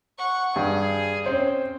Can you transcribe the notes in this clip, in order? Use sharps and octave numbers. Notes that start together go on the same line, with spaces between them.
F#5 C#6
G2 G#4
C4 C#4 C5